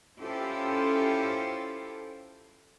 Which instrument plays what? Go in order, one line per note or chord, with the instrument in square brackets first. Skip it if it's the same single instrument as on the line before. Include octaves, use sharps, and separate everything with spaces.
[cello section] C#4 E4 F4 G4 A4 C5